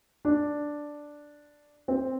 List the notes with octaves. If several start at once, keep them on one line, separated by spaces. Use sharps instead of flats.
D4
C4